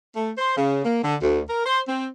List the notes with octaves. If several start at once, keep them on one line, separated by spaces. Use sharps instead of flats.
A3
C5
C#3
A#3
D3
D2
A#4
C5
C4